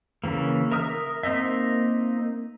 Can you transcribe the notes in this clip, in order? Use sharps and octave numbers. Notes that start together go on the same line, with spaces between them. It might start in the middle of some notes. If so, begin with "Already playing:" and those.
C#3 E3 A#3
A#4 E5 D#6 F6
A#3 C4 D#4 D#5 E5